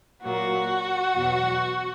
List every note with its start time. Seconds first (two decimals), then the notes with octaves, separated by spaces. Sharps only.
0.23 A#2 F#3 A#3 F#4
1.15 E2 B2 F#3